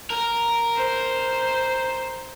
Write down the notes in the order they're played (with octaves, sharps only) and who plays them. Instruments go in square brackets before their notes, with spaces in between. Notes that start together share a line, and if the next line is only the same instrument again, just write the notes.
[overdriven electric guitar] A#4
[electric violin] C5